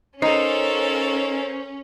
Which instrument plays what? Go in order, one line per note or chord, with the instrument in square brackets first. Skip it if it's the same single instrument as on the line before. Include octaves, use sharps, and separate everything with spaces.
[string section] C#4 [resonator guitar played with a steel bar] D#4 [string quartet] A4 A#4 F5 [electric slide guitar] C5